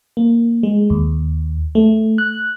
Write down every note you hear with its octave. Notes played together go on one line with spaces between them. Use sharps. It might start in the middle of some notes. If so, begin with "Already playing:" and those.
A#3
G#3
D#2
A3
F#6